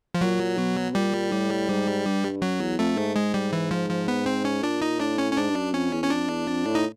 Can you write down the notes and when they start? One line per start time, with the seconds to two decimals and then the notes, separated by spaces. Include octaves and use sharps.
0.14 F3
0.21 A#2 F#3
0.57 B2
0.94 A#2 G3
1.31 A2
1.69 G#2
2.05 G2
2.42 F#2 F#3
2.60 E2
2.79 F2 A3
2.97 G#2
3.16 G#3
3.34 G3
3.53 E3
3.71 F3
3.90 F3
4.08 B3
4.26 C4
4.45 C#4
4.63 A#2 D4
4.81 D#4
5.00 A2 D4
5.18 C#4
5.32 C#4
5.37 G#2 D4
5.50 G2
5.55 F#2
5.74 F2 C#4
5.93 E2
6.04 C#4
6.10 F2 D4
6.29 E2
6.47 F2
6.66 A2
6.75 D#4